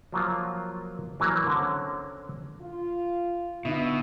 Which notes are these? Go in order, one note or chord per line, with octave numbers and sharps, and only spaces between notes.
F3 F#3 A#3 F4
E3 F#3 A#3
D3 C4 C#4
F4
B2 D3 D4 D#4 E5